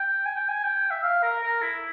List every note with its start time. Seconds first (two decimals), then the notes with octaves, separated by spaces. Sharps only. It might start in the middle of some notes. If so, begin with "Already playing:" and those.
Already playing: G5
0.26 G#5
0.36 G5
0.48 G#5
0.64 G5
0.91 E5
1.03 F5
1.23 A#4
1.43 A#4
1.62 E4